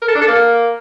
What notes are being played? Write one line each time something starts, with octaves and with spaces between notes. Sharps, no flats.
A#4
A4
D4
A4
A#3